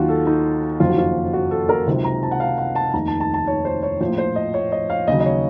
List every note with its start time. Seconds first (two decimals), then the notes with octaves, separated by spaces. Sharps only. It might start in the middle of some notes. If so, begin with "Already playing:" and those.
Already playing: D#2 D#3 F#3 F4 F#4
0.09 A4
0.27 D#4
0.80 F#1 F2 D#3 F#3 F4
0.89 F#4
0.98 F4
1.33 F#4
1.51 A4
1.69 A#4
1.87 C#2 C3 D#3 F#3 C5
2.05 A#5
2.23 A5
2.31 F#5
2.40 F5
2.58 F#5
2.75 A5
2.94 F1 D#2 D#3 A#5
3.07 A5
3.20 A5
3.34 A5
3.47 C#5
3.65 C5
3.83 C#5
4.01 A#1 A2 F3 C5
4.18 C5
4.36 D#5
4.54 C#5
4.72 D#5
4.90 F5
5.07 D#2 C#3 F#3 D#5
5.20 D#5
5.25 C#5